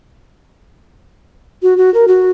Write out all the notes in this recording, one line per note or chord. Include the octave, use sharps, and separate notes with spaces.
F#4
F#4
A#4
F#4